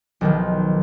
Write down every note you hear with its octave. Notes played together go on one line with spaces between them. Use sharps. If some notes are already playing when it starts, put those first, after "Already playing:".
B1 D#3 F3